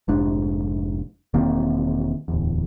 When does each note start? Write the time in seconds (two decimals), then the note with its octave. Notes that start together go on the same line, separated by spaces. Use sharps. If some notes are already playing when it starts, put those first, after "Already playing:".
0.08 F1 G#2 D4
1.34 E1 D#3 A#3 C4
2.28 D1 E2